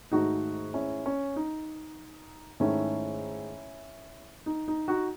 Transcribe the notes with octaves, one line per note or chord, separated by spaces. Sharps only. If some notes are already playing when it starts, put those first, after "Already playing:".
G#2 D#3 A3 D#4 F#4
C#4 E4
C#4
D#4
G#2 D#3 A3 C#4 E4
D#4
D#4
D#4 F#4